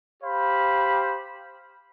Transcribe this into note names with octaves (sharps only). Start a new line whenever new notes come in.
G4 C5 F5 B5